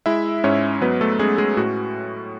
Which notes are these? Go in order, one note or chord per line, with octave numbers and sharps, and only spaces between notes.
G#3 E4 E5
G#2 C#4 C#5
F#3 B3 B4
A3 A4
G#3 C#4 G#4
G#3 G#4
A2 F#4